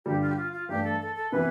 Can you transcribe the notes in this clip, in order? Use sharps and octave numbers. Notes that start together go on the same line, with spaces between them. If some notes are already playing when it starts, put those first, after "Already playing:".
G2 D3 G3 G4
F4
G4
F4
F4
G2 E3 A3 D4 G4
A4
A4
A4
C3 E3 B3 E4 B4